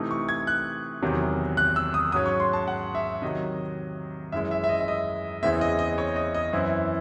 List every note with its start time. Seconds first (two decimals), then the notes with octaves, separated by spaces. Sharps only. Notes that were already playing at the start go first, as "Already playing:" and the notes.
Already playing: C3 E3 A3 D#4
0.11 C#6
0.29 G#6
0.47 F#6
1.02 E2 C3 D#3 F#3
1.57 F#6
1.76 E6
1.94 D#6
2.12 G#2 F#3 C#4 D#6
2.26 C#6
2.40 C6
2.53 A5
2.68 F#5
2.95 E5
3.22 C3 D#3 F#3 D#5
4.32 F#2 E3 G#3 E5
4.51 E5
4.64 E5
4.69 D#5
4.80 E5
4.88 D#5
5.43 E2 C#3 E3 C4 E5
5.61 D#5
5.79 D#5
5.98 C#5
6.16 D#5
6.34 D#5
6.53 F#2 E3 C4 E4